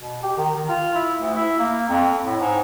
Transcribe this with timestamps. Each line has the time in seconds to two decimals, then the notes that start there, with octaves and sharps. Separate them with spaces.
0.01 B2
0.23 G4
0.37 D#3
0.56 D#3
0.69 F4
0.95 E4
1.21 D2
1.35 E4
1.59 A#3
1.89 F2
2.25 A2
2.40 G#2